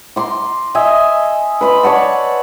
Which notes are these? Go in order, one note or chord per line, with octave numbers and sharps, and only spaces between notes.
A#5 C6 D6
D#5 E5 G#5
B4 B5 C6
C#5 D5 F#5 A5